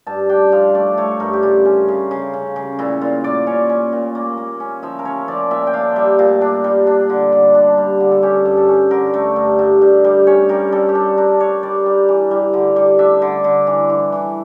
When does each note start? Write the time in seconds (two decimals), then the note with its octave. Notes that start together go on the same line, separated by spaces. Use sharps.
0.07 G2 A5
0.29 D4 G5
0.52 F3 F5
0.74 A3 D5
0.98 A3 C#5
1.20 G2 A#4
1.33 G4
1.43 C#3 F4
1.65 C#4
1.88 C#3
2.11 C#3
2.34 C#3
2.56 C#3
2.79 A#2 E4
3.01 A#2 F4
3.24 A#2 D5
3.47 C#4 C#5
3.69 C#4
3.93 A#2
4.15 A#3
4.37 A#3
4.60 C#4
4.83 F3 E5
4.99 A#4
5.05 C#4 C#5
5.28 F3 D5
5.51 A#2 E5
5.67 G5
5.73 D4 F5
5.96 G3 E5
6.19 A#2 F5
6.41 D4
6.64 G3
6.87 D4
7.10 D3
7.32 D3
7.55 D4
7.77 G3
8.00 D3
8.11 A4
8.23 C#4 G4
8.45 G2
8.57 A4
8.68 C#4
8.91 D3 A#4
9.14 A3
9.36 G2
9.59 G2
9.82 G2
10.04 G3
10.27 C#4 C#5
10.49 G3 A#4
10.72 G3 A4
10.89 G4
10.95 D4 A4
11.18 D4 A#4
11.40 D4 C#5
11.63 G3 D5
11.86 G3
12.08 E3
12.31 G3
12.53 D3
12.76 G3
12.99 D4 E5
13.22 D3
13.44 D3
13.67 E3
13.90 E3
14.12 E3